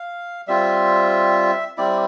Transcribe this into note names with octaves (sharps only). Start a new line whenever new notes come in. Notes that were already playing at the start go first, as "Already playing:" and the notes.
Already playing: F5
G3 C4 F4 E5
G3 C4 E4 D5